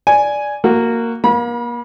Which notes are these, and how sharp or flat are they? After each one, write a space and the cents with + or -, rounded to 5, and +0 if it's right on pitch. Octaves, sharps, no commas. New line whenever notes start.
D5 +0 G#5 +0
A#3 -10 F#4 +0
A#3 +35 B5 -35